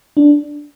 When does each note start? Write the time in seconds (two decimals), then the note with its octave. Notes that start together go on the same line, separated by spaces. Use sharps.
0.17 D4